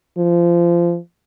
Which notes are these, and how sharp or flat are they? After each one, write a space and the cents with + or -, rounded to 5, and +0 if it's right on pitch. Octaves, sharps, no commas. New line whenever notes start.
F3 -25